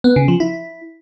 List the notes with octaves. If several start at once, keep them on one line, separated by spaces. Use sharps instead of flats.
B3
C#3
F3
E4